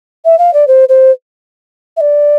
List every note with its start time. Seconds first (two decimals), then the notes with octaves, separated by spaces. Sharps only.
0.25 E5
0.38 F5
0.53 D5
0.67 C5
0.89 C5
1.97 E5
2.01 D5